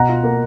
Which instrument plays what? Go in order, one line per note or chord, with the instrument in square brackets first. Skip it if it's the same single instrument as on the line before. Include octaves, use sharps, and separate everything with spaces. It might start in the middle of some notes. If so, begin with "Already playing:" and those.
Already playing: [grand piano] B2 F#5 A#5
F4
A#3